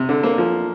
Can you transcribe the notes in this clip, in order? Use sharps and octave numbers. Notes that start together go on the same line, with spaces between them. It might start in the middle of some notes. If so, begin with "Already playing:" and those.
Already playing: C3
D3
A#3
F3